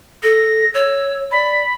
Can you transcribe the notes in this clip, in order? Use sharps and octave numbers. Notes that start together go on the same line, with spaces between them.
A4 A#6
C#5 E6
D5 B5